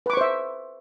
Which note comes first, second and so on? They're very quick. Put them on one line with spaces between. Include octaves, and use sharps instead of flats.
B4 D6 C#6 C5 E5